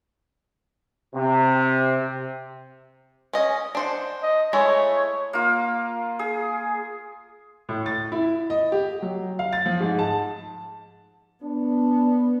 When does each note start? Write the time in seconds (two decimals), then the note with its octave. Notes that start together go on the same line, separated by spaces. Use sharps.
1.15 C3
3.33 C#4 D#5 G#5
3.75 D4 C5 F#5
4.22 D#5
4.53 G#3 A3 E4 C#5
5.33 A#3 F4
6.19 G#4
7.69 A2
7.86 A6
8.12 E4
8.50 D#5
8.72 G4
9.02 F#3
9.39 F5
9.53 A6
9.66 F3
9.80 G#2
9.99 A5
11.44 B3 D4